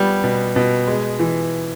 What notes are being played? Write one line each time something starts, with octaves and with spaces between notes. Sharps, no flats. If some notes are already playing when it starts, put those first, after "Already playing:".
Already playing: G3 B3
B2
B2
G#3
E3